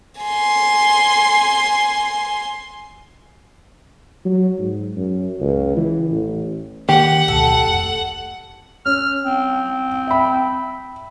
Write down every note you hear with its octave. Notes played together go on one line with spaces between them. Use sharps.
G#5 C6
F#3
G#2
F#2
C#2
E3
A1
D#3 A#3 G4 F#5
D1 B1 A4
F1
C#4 F6
C4
E5 B5